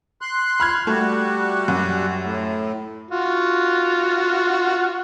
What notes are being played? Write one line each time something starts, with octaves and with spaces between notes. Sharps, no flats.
C6 F#6
B5 F6 G#6
G3 A3 F#4
F#2
A2
F4 F#4